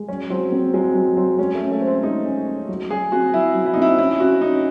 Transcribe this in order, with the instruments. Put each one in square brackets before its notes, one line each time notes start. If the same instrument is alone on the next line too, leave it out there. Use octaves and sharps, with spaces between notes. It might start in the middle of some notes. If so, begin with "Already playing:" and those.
Already playing: [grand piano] G#3
[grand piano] F#3 [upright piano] C#4
[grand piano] F#3 [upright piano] C4
[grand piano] C4
[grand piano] F#3 [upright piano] G#3
[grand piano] F#3 [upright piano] G#3
[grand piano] F#3 [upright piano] C4
[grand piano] G#3 [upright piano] C#4
[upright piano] A3
[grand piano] C#4
[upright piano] A3
[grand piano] C5
[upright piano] C4
[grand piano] G#3 [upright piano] D#4
[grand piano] C#4
C#4
F#3
[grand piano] F#3 [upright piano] G#4
[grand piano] C4 [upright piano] F#4
[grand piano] F#3 [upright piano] E4
[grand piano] F#3
[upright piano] E4
D#4
[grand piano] C4 [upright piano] E4
[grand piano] C#4 [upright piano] E4
[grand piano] C#4 [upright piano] F#4
[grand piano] C#4 [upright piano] D#4